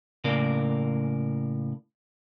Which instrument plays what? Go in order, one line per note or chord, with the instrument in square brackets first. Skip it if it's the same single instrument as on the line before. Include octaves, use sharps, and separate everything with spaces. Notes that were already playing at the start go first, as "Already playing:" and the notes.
[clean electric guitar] A2 C#3 A#3 A#4 D5